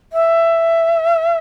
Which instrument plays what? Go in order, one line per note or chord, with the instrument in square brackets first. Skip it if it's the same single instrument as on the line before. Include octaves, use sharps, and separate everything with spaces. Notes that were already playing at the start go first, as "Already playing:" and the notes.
[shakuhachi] E5